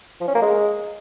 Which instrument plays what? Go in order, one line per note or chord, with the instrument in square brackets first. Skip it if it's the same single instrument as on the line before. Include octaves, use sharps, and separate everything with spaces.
[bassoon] F3
C#4
A#3
G#3